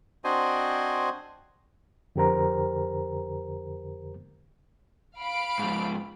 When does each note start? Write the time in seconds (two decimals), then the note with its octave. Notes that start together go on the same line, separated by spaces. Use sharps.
0.24 C4 D4 F#4 C5 D#5 G#5
2.16 F2 D3 G4 A#4 C5 A#5
5.18 F5 B5 D7
5.59 G#2 F3